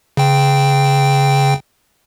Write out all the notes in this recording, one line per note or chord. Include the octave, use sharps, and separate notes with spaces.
C#3 G5